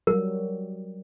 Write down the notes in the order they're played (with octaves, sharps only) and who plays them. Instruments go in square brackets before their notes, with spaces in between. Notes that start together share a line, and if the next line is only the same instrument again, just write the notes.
[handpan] F#3 G3 [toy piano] A#4